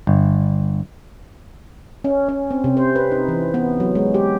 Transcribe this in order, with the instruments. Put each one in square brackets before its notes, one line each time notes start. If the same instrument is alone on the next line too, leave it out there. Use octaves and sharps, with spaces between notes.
[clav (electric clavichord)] G1
[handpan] C#4
C#4
C4
C3
C5
B4
D#4
E3
B3
F#3
G#3
G4